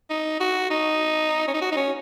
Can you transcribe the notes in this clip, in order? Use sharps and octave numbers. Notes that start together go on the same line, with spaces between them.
D#4
F#4
D#4
C#4
D#4
F#4
D#4
C#4